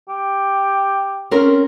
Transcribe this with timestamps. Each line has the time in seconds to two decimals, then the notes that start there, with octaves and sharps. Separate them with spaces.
0.09 G4
1.31 C4 C#4 A#4